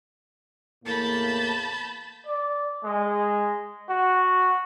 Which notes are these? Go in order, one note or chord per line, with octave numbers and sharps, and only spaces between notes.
E2 A2 A#3 A5 B5 G6
D5
G#3
F#4